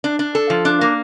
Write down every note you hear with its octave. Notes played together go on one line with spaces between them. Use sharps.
D4
D4
A4
F3
D4
A#3